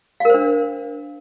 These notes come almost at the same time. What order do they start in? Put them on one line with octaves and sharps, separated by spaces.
F5 A#4 C5 D4